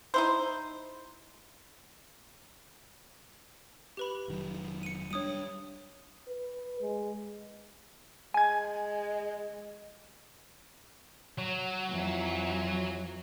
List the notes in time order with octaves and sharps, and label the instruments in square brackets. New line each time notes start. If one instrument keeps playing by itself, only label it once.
[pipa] D#4 E4 C5
[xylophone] G4 B4 B5
[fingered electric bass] F1 D#3 F#3
[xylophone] C#7 D#7
[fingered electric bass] G3 A#3 D4 [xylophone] C#5 D#6 D#7
[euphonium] B4
G#3
[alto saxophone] G#3 [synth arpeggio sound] G#5 G#6
[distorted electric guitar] F#3
[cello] F2 E3